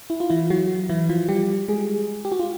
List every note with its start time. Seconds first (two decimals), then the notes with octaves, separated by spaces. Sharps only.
0.10 E4
0.20 F4
0.30 E3 E4
0.50 F#3 F#4
0.89 E3 E4
1.09 F3 F4
1.29 G3 G4
1.68 G#3 G#4
2.25 G4
2.32 F#4
2.39 F4